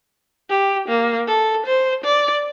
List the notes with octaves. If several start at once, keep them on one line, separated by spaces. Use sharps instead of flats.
G4
A#3
A4
C5
D5